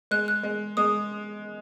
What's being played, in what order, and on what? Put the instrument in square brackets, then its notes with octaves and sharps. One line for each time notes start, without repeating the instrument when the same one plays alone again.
[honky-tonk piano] G#3 [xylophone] F#6
[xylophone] F#6
[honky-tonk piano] G#3
[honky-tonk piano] G#3 [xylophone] D#6